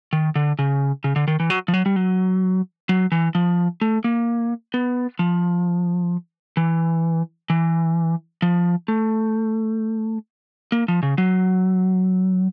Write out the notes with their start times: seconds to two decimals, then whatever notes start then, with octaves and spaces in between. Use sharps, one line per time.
0.13 D#3
0.36 D3
0.59 C#3
1.04 C#3
1.16 D3
1.28 D#3
1.40 E3
1.50 F#3
1.68 F3
1.74 F#3
1.86 G3
1.96 F#3
2.89 F#3
3.12 E3
3.35 F3
3.81 A3
4.04 A#3
4.74 B3
5.19 F3
6.57 E3
7.50 E3
8.42 F3
8.88 A3
10.72 A#3
10.88 F3
11.03 C#3
11.18 F#3